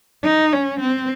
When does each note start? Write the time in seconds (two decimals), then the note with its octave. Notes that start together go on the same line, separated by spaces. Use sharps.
0.24 D#4
0.53 C#4
0.80 C4